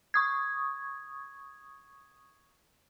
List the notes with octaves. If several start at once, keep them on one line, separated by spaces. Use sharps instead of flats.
C#6 D#6 G#6